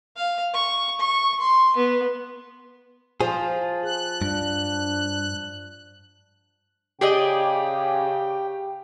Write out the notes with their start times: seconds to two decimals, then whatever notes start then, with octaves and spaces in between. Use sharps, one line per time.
0.16 F5
0.54 C#6
1.00 C#6
1.40 C6
1.77 B3
3.21 F3 G#4
3.84 F#6
4.22 G2 D4
7.01 C#3 G4 G#4 D5 D#5 G5